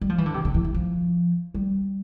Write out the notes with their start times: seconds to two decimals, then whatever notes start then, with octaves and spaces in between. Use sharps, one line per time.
0.01 G3
0.10 F3
0.18 E3
0.26 D3
0.34 C3
0.45 D3
0.54 E3
0.64 E3
0.74 F3
1.54 G3